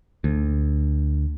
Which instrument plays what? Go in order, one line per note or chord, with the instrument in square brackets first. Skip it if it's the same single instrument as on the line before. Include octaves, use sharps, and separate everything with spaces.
[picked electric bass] D2